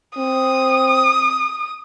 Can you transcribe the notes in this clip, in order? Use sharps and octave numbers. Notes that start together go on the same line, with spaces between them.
C4 D#6